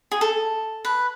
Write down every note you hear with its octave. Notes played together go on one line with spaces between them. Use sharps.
G#4
A4
B4